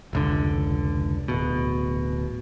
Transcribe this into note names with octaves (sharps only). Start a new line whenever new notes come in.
F1 C#2 D3
D1 B2